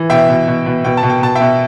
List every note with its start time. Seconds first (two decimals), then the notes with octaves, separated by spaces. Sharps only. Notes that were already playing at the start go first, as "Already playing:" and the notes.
Already playing: E3
0.10 B2 E5 G5
0.29 B2
0.47 B2
0.66 B2
0.85 B2 G5
0.97 A5
1.03 B2
1.10 G5
1.22 B2 A5
1.35 E5 G5
1.41 B2